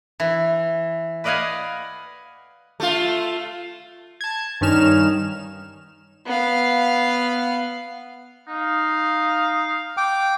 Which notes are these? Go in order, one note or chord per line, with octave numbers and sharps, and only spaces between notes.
E3
B4 D5 D#5 F5 F#5 G#5
A3 F4
A5 G#6
G2 D#3 C#4 D#4 F6 E7
B3 F5
D#4 F5
G5 D6